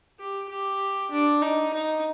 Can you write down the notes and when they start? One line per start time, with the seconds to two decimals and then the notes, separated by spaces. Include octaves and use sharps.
0.19 G4
0.49 G4
1.11 D4
1.42 D#4
1.73 D#4